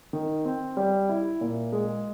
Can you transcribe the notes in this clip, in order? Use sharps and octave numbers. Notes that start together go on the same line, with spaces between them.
D#3
C4
G3
E4
A#2
G#3